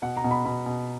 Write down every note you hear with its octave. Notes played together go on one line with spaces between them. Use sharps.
B2 F#5
A#5
B2
B5
B2 B5
B2